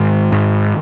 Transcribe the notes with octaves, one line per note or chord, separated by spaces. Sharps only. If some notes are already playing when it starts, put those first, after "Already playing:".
Already playing: G#2 D#3
G#2